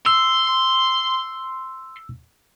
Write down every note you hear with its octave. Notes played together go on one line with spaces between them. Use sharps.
C6 E6